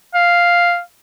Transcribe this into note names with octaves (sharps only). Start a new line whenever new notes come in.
F5